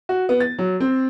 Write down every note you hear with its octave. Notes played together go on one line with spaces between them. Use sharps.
F#4
B3
A6
F#3
C4